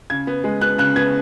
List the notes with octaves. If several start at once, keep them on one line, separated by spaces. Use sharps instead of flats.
C#3 G#6
B3
G#3
B3 F#6
C#3 F#6
B3 G#6